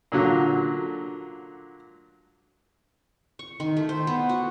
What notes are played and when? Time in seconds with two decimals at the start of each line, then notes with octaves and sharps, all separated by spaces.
0.12 A#2 D3 F#3
3.39 C#6
3.60 D#3
3.77 A3
3.89 C5
4.07 B3
4.29 F#4